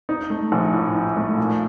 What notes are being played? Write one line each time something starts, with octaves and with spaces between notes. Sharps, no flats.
D#4
A3
A#1
A2
D#4
A3
A#2